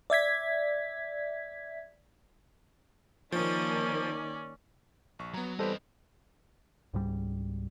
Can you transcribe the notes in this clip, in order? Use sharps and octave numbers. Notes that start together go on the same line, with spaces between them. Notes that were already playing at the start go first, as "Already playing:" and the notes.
D5 E5 G#6 B6
D#3 F3 A#3 C#4 D#4 D5
A#1 C#6
F#3 B3 A#5
E3 G3 B3 C4 A4 B4 C5 D#5
C#2 G#2 G3